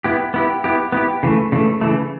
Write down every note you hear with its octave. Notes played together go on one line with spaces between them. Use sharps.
B3 E4 G4
B3 E4 G4
B3 E4 G4
B3 E4 G4
C#3 E3 A3
C#3 E3 A3
C#3 E3 A3